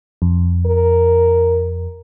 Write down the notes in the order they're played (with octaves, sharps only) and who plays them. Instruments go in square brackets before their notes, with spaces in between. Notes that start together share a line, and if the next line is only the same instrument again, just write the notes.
[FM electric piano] F2
[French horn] A#4